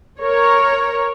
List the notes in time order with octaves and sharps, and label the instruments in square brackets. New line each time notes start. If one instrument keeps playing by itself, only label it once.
[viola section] A#4 C#5